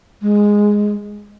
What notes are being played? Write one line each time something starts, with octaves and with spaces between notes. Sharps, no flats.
G#3